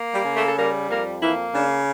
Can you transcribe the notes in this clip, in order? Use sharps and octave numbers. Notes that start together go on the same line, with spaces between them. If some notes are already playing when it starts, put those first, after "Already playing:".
Already playing: A#3
G3 G4
C#3
A3 A4
A4
G3 A#3 A#4
F2 A#3 A#4
E3 A#3 E4
C#3 D4